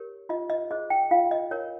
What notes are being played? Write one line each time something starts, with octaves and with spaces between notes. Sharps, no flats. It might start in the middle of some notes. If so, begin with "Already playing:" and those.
Already playing: G4 A#4 C#5
F4 D#5
D#5
G#4 C5 D#5
G5
F4 F5
D#5
A#4 C#5